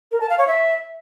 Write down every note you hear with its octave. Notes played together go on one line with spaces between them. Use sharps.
A#4
A5
F5
C#5
E5